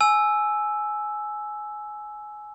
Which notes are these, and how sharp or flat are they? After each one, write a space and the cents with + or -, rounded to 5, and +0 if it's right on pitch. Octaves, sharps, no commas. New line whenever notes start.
G#5 +20 E6 +0